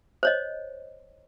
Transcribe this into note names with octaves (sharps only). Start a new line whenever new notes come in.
C5 C#5 D#5